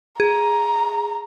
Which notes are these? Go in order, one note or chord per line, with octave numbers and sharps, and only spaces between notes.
G#4 A#5